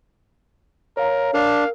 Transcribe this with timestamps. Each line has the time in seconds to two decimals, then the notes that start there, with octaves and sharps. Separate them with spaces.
0.97 A#4 C#5 F5 A#5
1.34 D4 A#4 F5